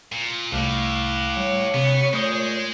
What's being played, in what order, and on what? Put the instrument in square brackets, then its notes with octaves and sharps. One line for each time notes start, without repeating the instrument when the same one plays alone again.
[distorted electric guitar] A#2
[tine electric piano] C2 A3 [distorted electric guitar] A2 [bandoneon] F5 D6 F#6
[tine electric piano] G3 [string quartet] C#5
[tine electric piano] C3 [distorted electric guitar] B3
[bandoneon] A#2 G6 [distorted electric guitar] G#3 [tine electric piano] A3 D#6